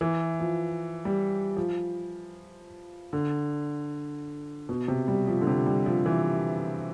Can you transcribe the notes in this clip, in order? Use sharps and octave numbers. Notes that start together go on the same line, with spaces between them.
E3
F3
G3
F3
D3
B2
C3
G3
F3
D3
C3
G3
F3
E3